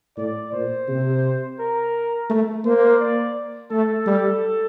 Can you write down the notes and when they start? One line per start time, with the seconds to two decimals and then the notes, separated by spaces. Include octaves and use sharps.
0.17 A2 D5
0.53 A#2 C5
0.88 C3
1.59 A#4
2.30 A3
2.65 A#3 C5
3.00 D5
3.71 A3 A4
4.07 G3